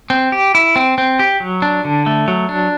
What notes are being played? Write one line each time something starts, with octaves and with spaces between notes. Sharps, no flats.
C4
G4
E4
C4
C4
G4
F#3
D4
D3
A3
F#3
D4